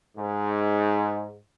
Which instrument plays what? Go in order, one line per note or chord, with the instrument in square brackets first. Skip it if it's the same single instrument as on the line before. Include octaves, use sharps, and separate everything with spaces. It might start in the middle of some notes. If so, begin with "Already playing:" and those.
[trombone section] G#2